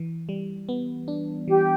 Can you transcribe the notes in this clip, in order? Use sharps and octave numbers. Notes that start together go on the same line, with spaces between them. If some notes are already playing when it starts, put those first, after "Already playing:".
Already playing: E3
G3
B3
D4
E3 G4